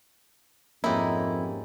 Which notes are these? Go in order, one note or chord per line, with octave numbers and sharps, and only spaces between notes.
F2 G#2 A#3 C#4 E4 G4 D#5